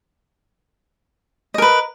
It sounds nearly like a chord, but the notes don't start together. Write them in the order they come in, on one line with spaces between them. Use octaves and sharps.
D#5 A#4 B4